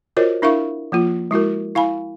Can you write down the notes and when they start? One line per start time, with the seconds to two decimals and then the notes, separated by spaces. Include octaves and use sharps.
0.17 F4 F#4 A#4 C5 C#5 D#5
0.42 D4 E4 A#4 E5 F5 C#6
0.92 F3 A#3 F4
1.31 G#3 E4 F#4 A#4
1.75 E4 F5 G#5 B5